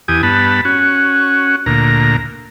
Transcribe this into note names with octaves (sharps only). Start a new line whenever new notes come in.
E2 G4 G#5 D#6
G2 B3 A5 B5
C#4 F#4
D2 A#2 A#5